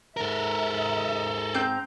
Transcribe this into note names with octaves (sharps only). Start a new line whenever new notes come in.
G#2 A4 A#4 E5 A#5
C4 G6